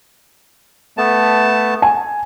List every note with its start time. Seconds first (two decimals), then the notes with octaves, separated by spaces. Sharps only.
0.98 A3 B3 A5
1.82 G#5